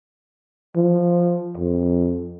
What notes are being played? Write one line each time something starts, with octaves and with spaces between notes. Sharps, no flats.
F3
F2